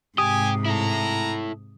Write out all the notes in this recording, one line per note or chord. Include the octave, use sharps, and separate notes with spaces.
G#2 C3 G4 G#5 D#6
E4 A4 A#5